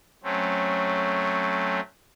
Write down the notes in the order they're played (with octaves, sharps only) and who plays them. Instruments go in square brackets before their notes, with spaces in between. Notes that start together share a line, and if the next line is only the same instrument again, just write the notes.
[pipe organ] F#3 A3 C4 C#4